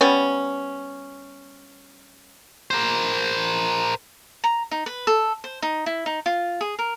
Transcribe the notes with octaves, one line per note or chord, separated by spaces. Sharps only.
G3 B3 C#4
A#4 C5
A#5
D#4
B4
A4
C5
D#4
E4
D#4
F4
G#4
A#4